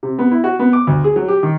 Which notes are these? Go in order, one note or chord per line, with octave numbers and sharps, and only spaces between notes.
C3
B3
E4
F#4
B3
D6
D2
G#4
F#3
G4
D#3